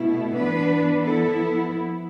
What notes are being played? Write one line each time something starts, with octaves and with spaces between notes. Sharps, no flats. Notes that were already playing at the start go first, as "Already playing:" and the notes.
Already playing: B2 A3 E4
E3 B3 D4 B4
F3 B3 E4 A4